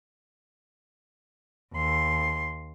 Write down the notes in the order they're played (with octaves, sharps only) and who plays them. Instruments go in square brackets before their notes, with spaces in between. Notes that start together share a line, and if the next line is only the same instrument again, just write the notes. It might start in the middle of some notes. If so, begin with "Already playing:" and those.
[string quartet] D#2 C6